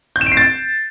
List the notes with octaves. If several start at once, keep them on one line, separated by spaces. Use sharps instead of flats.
G6
E7
D7
C7
A6